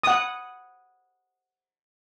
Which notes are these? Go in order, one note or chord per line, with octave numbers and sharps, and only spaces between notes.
F#5 D#6